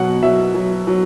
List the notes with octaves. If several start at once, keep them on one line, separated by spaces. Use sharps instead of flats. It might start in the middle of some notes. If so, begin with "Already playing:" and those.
Already playing: B2 F#3 F#5
F#3 E5
F#3
F#3